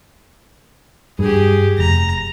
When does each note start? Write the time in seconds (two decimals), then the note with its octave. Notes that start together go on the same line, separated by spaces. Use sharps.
1.19 G2 G4 G#4
1.79 F1 A#5